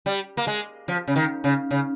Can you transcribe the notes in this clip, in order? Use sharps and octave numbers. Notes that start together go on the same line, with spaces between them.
G3
A#3
G#3
F3
C#3
D#3
C#3
C#3